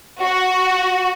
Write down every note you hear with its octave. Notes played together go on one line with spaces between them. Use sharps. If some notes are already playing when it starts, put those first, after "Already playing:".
F#4